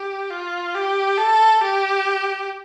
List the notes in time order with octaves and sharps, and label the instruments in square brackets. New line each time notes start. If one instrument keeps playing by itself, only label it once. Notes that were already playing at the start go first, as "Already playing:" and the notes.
Already playing: [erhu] G4
F4
G4
A4
G4